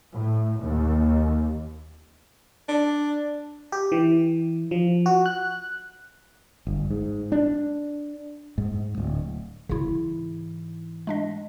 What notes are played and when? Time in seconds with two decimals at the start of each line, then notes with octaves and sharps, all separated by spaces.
0.13 A2
0.62 D#2
2.68 D4
3.72 G4
3.92 E3
4.71 F3
5.06 F#4
5.26 F#6
6.67 G1
6.90 G#2
7.32 D4
8.58 G#2
8.98 D1
9.69 G#2 C#3 E3 E4
11.07 G#3 D4 D#5